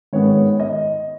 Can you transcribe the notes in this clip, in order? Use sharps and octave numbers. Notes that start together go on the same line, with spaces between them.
G#2 D#3 G#3 B3 C#5
D#5